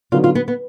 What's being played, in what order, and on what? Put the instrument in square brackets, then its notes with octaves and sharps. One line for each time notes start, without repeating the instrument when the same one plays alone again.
[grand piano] D3 F#3 B3 D#4 F#4 [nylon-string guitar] F4
[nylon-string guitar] F4
B3
B3